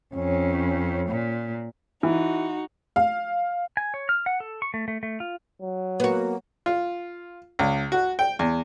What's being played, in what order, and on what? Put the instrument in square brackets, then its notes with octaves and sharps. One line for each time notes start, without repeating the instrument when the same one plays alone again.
[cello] F2 [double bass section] C#4
[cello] A#2
[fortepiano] E3 [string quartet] D#4 F#4
[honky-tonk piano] F5
[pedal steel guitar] G#5
C#5
F6
F#5
A4
C#6
A3
A3
A3
F4
[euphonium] F#3
[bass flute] A#3 [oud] B3 F#4
[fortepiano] F4
C#2
F#4
G5
E2